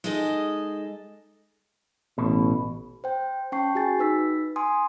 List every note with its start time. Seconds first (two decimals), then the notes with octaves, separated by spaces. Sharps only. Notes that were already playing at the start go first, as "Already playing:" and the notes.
0.04 G#3 D#4 G#4 A4 D#5
2.18 A1 B2
3.04 C5 G5
3.52 C#4 G5 A5 C#6 C7
3.75 F#4 G#4 G#5 A6
3.99 D#4 B4 E6 B6
4.56 G#5 C6 D#6